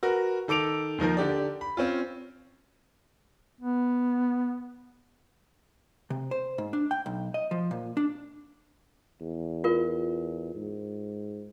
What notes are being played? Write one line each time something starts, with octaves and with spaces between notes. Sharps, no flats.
F#4 A#4 B4
D#3 A4 D6 D7 F7
D#2 D#3 F3 A#4
D3 G4 D5
B5
C4 C#4 F4
B3
C3
C5
G#2
D4
G5
B1
D#5
F3
A#2
D4
E2
F4 A#4
G#2